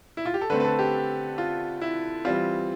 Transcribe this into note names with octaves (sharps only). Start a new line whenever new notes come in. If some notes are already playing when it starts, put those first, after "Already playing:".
E4
F4
G4
A4
D3 A3 C4 B4
B4
A4
G4
F4
E4
E3 G3 C4 F4